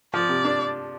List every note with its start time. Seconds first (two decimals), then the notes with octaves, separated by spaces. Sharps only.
0.13 F3 D5
0.29 C3
0.45 D4